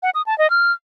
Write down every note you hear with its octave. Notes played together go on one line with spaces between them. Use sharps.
F#5
D#6
A5
D#5
F6